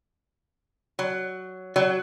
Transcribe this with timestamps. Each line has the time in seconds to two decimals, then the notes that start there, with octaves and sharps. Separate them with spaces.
0.99 F#3
1.76 F#3